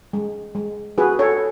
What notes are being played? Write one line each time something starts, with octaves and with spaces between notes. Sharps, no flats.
G#3
G#3
F#4 G#4 B4
A4 C#5